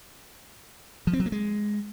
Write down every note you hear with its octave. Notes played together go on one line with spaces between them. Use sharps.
F3
C4
F#3
A#3
G#3